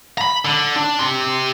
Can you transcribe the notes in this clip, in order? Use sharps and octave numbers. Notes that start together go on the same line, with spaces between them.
A#5 B5
D3
D4
G4 C6